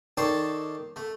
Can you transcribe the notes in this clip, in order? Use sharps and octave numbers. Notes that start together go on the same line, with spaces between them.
D#3 A4 C#5 D5 A5 C6
A3